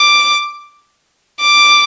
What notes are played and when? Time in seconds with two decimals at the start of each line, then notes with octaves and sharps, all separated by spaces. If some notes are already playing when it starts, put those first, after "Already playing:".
Already playing: D6
1.40 D6